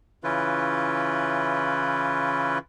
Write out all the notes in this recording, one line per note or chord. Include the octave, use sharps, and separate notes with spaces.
C#3 E3 C#4 E4 F4 B4